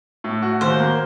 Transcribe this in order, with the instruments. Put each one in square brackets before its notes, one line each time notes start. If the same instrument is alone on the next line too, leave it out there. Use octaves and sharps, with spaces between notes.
[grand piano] A2
F#4
[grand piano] D#2 [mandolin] C5
[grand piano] A#3